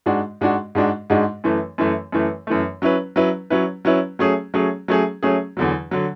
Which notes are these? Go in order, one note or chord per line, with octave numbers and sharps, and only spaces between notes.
G#2 G#3 D4 F#4
G#2 G#3 D4 F#4
G#2 G#3 D4 F#4
G#2 G#3 D4 F#4
F#2 E3 A3
F#2 E3 A3
F#2 E3 A3
F#2 E3 A3
F#3 C#4 E4 B4
F#3 C#4 E4 B4
F#3 C#4 E4 B4
F#3 C#4 E4 B4
F#3 A3 C#4 G#4
F#3 A3 C#4 G#4
F#3 A3 C#4 G#4
F#3 A3 C#4 G#4
E2 D3 F#3
D3 F#3